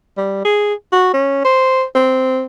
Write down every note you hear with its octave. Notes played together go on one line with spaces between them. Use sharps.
G3
G#4
F#4
C#4
C5
C4